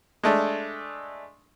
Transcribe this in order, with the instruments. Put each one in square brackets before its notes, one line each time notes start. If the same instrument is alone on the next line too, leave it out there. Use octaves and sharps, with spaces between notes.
[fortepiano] G#3 A3 D4